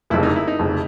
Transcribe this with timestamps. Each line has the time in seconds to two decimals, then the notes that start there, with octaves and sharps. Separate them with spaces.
0.10 F1 E4
0.14 F2 C#3
0.23 D#4
0.36 E4
0.48 D#4
0.59 F1 F2 C#3